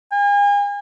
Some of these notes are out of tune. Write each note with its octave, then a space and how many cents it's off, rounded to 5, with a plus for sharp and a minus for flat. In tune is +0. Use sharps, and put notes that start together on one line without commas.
G#5 -40